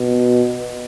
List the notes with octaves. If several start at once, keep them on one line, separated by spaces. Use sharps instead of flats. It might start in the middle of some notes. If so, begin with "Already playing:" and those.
Already playing: B2